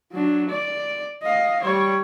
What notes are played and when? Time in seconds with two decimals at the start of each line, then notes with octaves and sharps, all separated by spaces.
0.12 F#3 D4
0.49 D5
1.22 D#5 F5
1.62 G3 C#5